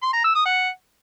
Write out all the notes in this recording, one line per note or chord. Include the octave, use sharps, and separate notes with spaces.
C6
A#5
E6
D#6
F#5